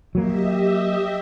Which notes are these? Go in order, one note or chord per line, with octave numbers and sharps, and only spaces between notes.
F#3 A#3 G4 D#5 E5